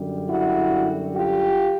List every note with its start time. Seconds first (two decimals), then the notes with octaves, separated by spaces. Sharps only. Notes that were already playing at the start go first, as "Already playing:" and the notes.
Already playing: F#2 D3 G3
0.29 E4 F#4
1.14 F4 G4